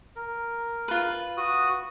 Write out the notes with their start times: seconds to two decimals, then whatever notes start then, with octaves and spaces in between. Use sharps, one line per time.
0.16 A#4
0.88 F4 B4
1.37 F#4 D#6